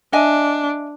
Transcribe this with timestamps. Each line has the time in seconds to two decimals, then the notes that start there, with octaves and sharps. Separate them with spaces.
0.13 D4 D#5 E5 G#5